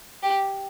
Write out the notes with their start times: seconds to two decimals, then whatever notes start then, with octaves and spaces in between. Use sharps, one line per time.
0.23 G4